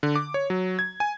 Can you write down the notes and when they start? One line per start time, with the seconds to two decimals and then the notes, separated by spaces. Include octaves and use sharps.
0.03 D3
0.16 D6
0.34 C#5
0.50 F#3
0.79 G#6
1.00 G#5